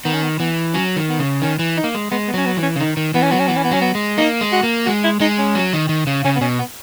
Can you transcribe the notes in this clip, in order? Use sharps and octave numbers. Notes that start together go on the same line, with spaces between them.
D#3 B3
C#4
B3
E3 B3
F#3 C#4
D#3
B3
C#3
D#3 C#4
E3
D#4
A#3
G#3
G#3 B3
B3
F#3 C#4
B3
E3
C#4
C#3
D#3 D#4
D#3
E3 B3
C#4
F#3 B3
C#4
E3 B3
C#4
B3
F#3 C#4
B3
G#3
A#3 D#4
G#3
F#4
A#3
G#3 F#4
E4
G#3 D#4
C#4
F#3
D#3
D#3
C#3
C#3 C#4
B3
B2 C#4
B3